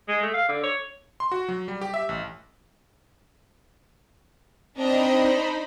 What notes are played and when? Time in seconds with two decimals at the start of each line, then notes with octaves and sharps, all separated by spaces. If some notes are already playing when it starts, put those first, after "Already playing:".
0.08 G#3
0.22 A3
0.34 F5
0.48 D3
0.63 C#5
1.20 C6
1.32 F#4
1.48 F#3
1.68 G3
1.81 G4
1.94 E5
2.09 A1
4.78 C4 D4 D#4 C5 D#5 A#5 B5